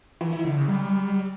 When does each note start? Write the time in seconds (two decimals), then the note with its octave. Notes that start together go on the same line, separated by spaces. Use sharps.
0.21 E3
0.33 E4
0.44 D3
0.56 C#3
0.68 G3